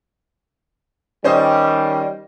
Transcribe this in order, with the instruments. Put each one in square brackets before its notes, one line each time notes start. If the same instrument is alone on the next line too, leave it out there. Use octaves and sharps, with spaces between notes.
[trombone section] D#3 G3 [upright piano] C#4 C5 D#5